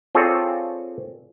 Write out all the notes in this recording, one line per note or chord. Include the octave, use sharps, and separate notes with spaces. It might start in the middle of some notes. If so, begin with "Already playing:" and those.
C4 F4 G#4 A4 C#5 D5